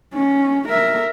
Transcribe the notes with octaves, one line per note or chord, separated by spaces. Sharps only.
C#4
A#4 E5